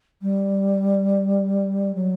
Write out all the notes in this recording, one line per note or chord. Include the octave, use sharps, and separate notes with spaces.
G3
F#3